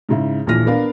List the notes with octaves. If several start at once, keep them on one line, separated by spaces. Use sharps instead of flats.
G#2 C#3 E4
D#1 A#1 E3 F3 F6 A#6
B3 D4 A#4 F5